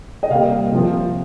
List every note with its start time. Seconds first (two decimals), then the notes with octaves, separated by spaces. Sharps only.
0.23 D#5
0.30 C3 G3 A#3 F5
0.72 C3 F3 C4